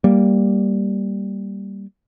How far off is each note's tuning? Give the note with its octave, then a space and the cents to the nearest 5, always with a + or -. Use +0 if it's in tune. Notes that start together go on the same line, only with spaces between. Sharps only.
G3 +0 A#3 +0